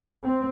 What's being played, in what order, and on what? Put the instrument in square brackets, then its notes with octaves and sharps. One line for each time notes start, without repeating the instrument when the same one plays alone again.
[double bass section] C4